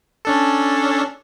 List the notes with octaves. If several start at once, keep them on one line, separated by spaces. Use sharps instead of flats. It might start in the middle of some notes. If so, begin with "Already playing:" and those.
C#4 D4 A4